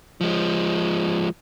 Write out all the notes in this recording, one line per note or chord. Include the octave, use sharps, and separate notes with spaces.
F3 G#3